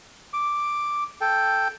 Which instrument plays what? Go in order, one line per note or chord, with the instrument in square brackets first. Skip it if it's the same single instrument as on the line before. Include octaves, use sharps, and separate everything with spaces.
[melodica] D6
A4 G5